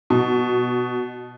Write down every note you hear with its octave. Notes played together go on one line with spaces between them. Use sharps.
B2